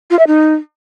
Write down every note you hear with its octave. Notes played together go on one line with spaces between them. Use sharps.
F4
E5
D#4